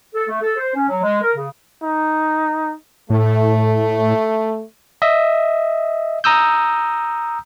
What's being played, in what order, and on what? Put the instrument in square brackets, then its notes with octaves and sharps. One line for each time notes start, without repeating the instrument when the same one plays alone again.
[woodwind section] A4
A3
A4
C5
C#4
F#3
G#3
A#4
C#3
[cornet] D#4
[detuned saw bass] A2 [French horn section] A3
[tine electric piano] D#5 E5
A#5 D#6 E6 G6